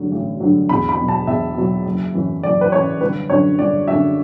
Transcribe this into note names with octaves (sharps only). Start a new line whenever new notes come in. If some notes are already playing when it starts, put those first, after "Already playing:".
Already playing: A1 G2 D3 F#3
A1
G2 D3 F#3
E2 B5
B5
B2 F#3
A5
E2 E5
B2 F#3
F#1
F#2 E3
F#1 D5
B4
F#2 E3 C#5
G1 B4
F#2 D3 F#3 C#5
G1 D5
F#2 D3 F#3 E5